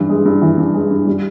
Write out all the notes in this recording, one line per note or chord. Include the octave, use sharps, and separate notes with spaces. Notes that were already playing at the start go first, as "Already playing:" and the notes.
Already playing: G2 E3
G#3
G2
E3
G2
G#3
G2
G3